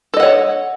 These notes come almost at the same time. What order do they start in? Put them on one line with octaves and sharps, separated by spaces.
A4 D#5 F#5 C#5